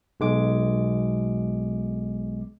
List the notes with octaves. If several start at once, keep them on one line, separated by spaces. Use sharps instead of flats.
B1 G#3 D6